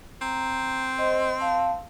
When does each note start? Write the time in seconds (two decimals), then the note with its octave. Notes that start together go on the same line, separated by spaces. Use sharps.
0.22 C4 A#5
0.98 C5 D#5 C6
1.40 F5 A5